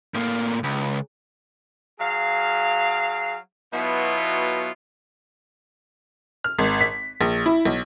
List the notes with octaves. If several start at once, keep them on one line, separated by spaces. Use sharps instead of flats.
A2 A#3
C#2
F#3 G#4 F5
B2 F#3 B3 E4 F4
F6
G#1
B6
A#1
E4
B1